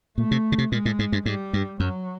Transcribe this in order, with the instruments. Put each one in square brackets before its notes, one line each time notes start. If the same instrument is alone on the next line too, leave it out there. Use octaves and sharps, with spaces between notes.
[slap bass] A#2 [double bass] A3
[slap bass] C3
C#3
C3
[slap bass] A#2 [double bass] G#3
[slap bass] A2
G#2
G2
[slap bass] G#2 [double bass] G3
[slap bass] G2
[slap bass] F#2 [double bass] F#3